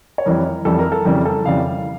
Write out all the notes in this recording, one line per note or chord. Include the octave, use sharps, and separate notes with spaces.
C#5
F2 E3 G3 A#4
F2 E3 G3 A4
A#4
A4
F2 C#3 E3 G3 A#4
A4
F2 C#3 E3 G3 F5